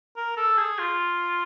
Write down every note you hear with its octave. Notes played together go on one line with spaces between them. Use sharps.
A#4
A4
G#4
F4